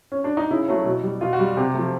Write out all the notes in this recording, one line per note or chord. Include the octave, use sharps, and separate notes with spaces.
C#4
D4
D#4
C#3 E4
F#3 A3
B2
G3
B2 F4
F#4
G3
C3 G4
F3 A3